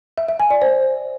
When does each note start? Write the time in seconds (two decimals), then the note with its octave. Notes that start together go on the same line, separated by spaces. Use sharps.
0.18 E5
0.29 E5
0.40 G#5
0.51 D5
0.62 C5